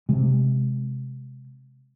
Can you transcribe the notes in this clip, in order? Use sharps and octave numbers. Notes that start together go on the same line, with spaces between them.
C3 G#3